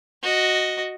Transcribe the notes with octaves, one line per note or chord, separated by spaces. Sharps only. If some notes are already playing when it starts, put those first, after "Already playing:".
F#4 D#5